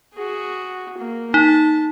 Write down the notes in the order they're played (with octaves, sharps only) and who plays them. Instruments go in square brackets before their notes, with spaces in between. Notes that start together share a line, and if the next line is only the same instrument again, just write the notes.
[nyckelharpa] F#4 G#4
A#3
[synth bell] D#4 [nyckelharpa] A5